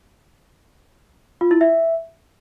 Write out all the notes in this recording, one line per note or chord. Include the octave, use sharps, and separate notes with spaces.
F4
E4
E5